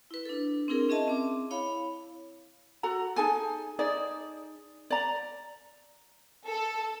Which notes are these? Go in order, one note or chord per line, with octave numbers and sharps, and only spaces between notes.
E4 B4
D4 A4
C4 D4 E4 G#4 A#4
C#4 G#4 D#5 E5 A5
C4 D6
E4 C#5 F5 B5
F#4 A4 A#5
D#4 G#4 A4 G#5
D#4 G#4 D5
D5 A#5
A4